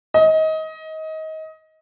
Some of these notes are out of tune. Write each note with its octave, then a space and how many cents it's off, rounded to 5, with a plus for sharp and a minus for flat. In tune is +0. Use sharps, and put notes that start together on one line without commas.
D#5 +25